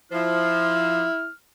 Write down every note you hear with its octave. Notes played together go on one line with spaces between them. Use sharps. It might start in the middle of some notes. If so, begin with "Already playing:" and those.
F3 E4 F6